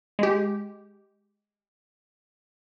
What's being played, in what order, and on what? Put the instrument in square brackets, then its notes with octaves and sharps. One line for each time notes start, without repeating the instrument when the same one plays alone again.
[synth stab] G#3 G4